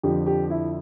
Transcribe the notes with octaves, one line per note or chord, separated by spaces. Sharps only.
F2 D3 F3 G4
G4
E4